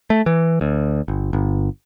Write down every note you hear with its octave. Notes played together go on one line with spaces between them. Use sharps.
A3
E3
D2
G1
G1